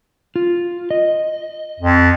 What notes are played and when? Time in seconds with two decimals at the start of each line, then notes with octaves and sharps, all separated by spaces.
0.36 F4
0.91 D#5
1.80 F2